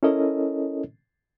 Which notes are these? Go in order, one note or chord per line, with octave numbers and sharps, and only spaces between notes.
C#4 E4 A4 A#4 C#5 D#5